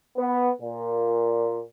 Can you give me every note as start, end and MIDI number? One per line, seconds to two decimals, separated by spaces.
0.17 0.50 59
0.61 1.60 46